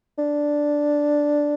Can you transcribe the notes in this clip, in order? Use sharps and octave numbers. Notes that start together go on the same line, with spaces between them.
D4